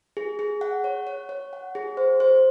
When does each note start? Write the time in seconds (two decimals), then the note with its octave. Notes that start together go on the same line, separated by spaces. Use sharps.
0.17 G#4
0.39 G#4
0.61 F#5
0.84 C#5
1.07 C#5
1.29 C#5
1.53 F#5
1.75 G#4
1.97 C5
2.20 C5